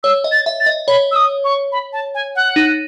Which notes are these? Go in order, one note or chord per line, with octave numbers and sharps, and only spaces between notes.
C#5 E6
D#5
A6
E5
A6
D#5
C#5 B5
E6
D#6
C#6
B5
A5
G#5
F#5
D#4